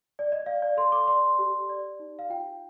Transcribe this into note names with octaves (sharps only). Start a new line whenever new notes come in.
D5
D#5
D5 F5
D5
A4 C6
D6
D5 C6
G4
D5
D#4
F5
F4 G5